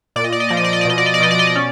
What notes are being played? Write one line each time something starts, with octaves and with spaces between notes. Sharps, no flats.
A#2 D5
D#5
D5
D#5
F3 D5
D#5
D5
D#5
D5
B2 D#5
D5
D#5
D5
B2 D#5
D5
D#5
D5
C#4